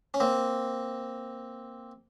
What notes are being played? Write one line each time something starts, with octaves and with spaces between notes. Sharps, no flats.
C#4
A#3 C4